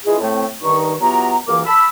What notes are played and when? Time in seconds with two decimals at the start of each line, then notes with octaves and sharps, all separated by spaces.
0.06 E3 G#3 E4 F4 G#4
0.21 A2 A3 C4
0.62 G2 D#3 D#4 C#6
1.01 E3 F#3 B3 F4 G4 A#5
1.48 C#2 F#2 E3 A#3 A#4 D6
1.66 A5 B5 E6